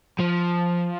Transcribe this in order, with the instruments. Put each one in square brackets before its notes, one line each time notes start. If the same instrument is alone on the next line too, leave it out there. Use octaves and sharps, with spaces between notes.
[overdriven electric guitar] F3